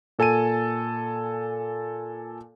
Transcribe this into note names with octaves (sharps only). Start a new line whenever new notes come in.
A#2 A4 G#5 A5 D#7